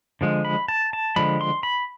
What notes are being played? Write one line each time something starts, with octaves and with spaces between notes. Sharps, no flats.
D3 F3 G#3
B5
A5
A5
D3 F3 G#3 B5
C6
B5